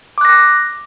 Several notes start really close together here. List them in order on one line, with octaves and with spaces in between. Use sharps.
D6 F#6 A#6